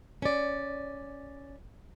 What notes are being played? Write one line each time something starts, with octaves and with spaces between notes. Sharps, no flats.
C#4 D5